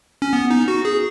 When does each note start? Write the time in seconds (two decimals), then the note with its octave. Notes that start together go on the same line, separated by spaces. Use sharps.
0.22 C#4
0.33 B3
0.50 D#4
0.68 F#4
0.85 G#4